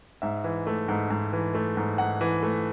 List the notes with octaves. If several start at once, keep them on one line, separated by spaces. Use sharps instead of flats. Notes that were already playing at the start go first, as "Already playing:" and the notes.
G#2 E5
E3
A3
G#2
G#2
E3
A3
G#2
G#2 F#5
E3
A3